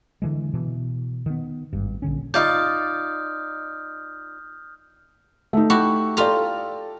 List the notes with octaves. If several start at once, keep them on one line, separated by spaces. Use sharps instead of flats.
D3 E3 G#3
B2 E3
D#3 B3
G#1 G2
A#1 D3 C#4
D#4 F4 D5 D#6 F6 G6
A3 D#4
E4 F#4 G4
F4 G4 A4 D5 A#5